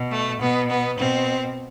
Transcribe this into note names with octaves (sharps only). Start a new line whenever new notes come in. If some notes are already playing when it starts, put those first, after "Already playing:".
Already playing: B2
A3
B2 B3
B3
B2 C4